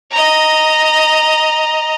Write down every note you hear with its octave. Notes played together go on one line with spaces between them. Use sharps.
D#5 A#5